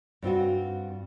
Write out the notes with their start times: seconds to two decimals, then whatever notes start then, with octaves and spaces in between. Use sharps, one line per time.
0.22 G2 C4 F4 F#4